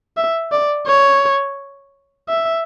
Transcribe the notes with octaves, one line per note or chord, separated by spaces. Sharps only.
E5
D5
C#5
E5